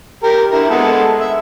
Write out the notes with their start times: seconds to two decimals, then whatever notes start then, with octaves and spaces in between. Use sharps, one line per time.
0.23 G4 A#4
0.51 D3 E4 A#4
0.70 G#3 B3 A4
1.20 E5